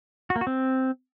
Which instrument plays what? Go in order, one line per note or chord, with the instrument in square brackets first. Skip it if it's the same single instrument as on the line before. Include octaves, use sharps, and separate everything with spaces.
[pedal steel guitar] F#4
A#3
F#4
C4